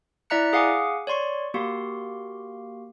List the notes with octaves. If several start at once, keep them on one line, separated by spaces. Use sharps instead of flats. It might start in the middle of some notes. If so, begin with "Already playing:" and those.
E4 D5 E5 A#5 F#6 C#7
G#4 F5 F#5 G#5 D6
C#5 D5 C6 C#6
A#3 F#4 G4 F5 C6